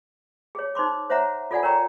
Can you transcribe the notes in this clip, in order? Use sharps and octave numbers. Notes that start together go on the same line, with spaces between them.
G#4 C#5
D#4 C5 C6 D6
C5 C#5 E5 F#5 A#5
F4 A4 D5 F#5 G#5
A#4 C#5 G5 A#5 C#6